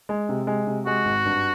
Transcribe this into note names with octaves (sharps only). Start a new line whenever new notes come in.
G#3
C3
G#3
C3
G#3 F#4
G#1
G2